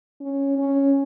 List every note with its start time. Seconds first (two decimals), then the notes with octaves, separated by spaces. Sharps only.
0.20 C#4
0.58 C#4